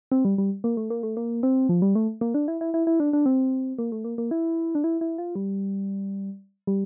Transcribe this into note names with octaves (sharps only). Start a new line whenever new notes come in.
C4
G3
G3
A#3
A3
A#3
A3
A#3
C4
F3
G3
A3
A#3
D4
E4
E4
E4
E4
D4
D4
C4
A#3
A3
A#3
A#3
E4
D4
E4
E4
F4
G3
G3